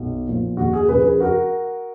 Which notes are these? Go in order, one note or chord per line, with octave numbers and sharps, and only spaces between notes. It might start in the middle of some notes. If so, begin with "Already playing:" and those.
Already playing: B1
A#2 F3
D#2 F#4
G#4
C#3 F3 G#4 B4
G#4 B4
F#4 A#4